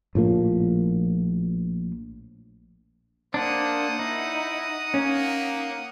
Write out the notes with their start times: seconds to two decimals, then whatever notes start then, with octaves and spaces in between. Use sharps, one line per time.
0.15 A#1 A2 F3 A#3
3.34 A#3 D4 C5 F#5 D#6
3.99 D#4 E4
4.94 A#3 C#4